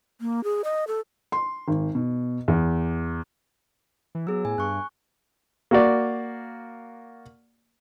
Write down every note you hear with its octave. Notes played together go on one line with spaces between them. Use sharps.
A#3
G#4
D#5
A4
C6
G#1
B2
E2
E3
F#3 B3 G#4 E6
A2 G#5
G2 C#6 F#6
A#3 F#4 D5